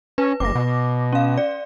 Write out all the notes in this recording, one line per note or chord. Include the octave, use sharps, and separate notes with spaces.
C#4 B4
F#1 D6 A#6
B2
C#4 F5
D5